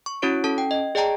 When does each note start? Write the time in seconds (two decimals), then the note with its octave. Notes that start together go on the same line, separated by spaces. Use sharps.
0.06 C#6
0.22 C#4 E4 F#4 C#5 D7
0.44 C#4 A4 A5
0.58 G5
0.71 D#5
0.95 G#4 D5 D#5 G5 A5 A#5